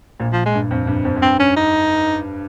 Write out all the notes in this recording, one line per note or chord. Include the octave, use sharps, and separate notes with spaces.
A#1 A#2
F3
G#3
G2
F2
G2
F2
F2
G2 C4
C#4
D#4